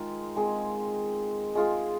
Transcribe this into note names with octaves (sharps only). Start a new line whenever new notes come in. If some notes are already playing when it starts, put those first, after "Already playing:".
Already playing: D#3 G#3 F4
G#3 C4 G#4
G#3 F4 G#4